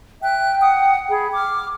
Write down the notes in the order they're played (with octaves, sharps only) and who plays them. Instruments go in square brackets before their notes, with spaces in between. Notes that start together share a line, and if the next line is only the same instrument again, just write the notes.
[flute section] E5 F#6 [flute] G5
[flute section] F#5 D#6
G#4 B5
D6 F6